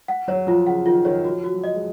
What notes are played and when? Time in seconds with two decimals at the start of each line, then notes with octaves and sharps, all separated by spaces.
0.08 F#5
0.28 F#3 C#5
0.47 F3 F4
0.67 C#3 F#5
0.86 D#3 F4
1.05 D#3 C#5
1.25 F3 F#4
1.44 F#4
1.54 F#3
1.64 D#5
1.74 G#3